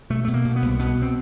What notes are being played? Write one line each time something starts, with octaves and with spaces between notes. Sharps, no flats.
B2 A3
B2 A3
A#3
B2
B3
C2
B2 B3
C4